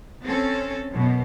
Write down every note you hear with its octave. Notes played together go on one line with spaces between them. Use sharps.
C4 C#4 A4
F#2 B2